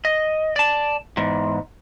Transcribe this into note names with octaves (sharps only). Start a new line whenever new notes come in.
D#5
D5 A5
E2 G#2